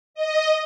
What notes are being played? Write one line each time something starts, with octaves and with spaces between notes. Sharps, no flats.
D#5